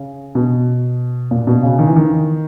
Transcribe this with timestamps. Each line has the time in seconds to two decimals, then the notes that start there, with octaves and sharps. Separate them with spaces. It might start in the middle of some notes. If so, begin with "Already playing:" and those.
Already playing: C#3
0.35 B2
1.31 A#2
1.47 B2
1.63 C#3
1.79 D#3
1.87 E3
1.96 D#3